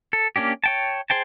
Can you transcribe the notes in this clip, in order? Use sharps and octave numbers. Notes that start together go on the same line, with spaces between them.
A4
A#3 C#4 D4 G4
C#5 G5 A5
G#4 C5 G5 A5